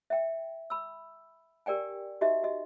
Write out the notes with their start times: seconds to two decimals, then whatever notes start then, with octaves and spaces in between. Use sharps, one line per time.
0.10 E5 G5
0.70 B5 E6
1.66 G4 A#4 D5 G5 G#5
2.21 D#4 F#4 G4 D#5 E5
2.44 F#4 D#5